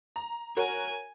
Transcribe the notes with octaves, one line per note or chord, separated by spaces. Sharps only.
A#5
F#4 A#4 C#5 G#5